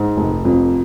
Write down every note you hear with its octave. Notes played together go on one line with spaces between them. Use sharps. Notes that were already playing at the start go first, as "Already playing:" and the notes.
Already playing: G#2
F1
F2